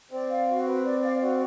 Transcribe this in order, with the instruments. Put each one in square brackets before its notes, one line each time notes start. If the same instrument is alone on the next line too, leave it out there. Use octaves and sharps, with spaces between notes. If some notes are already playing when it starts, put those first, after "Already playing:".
[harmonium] C4 [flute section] D5
[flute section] F5
F#4
B4
D5
F5
F#4